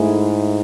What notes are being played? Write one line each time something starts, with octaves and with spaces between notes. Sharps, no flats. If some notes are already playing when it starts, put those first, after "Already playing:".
Already playing: G#2 A3 E4 G#4